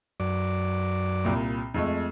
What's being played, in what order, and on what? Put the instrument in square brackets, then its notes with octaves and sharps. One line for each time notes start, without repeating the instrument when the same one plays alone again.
[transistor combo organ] F#2 D5
[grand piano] C2 A#2
F2 G#3 A3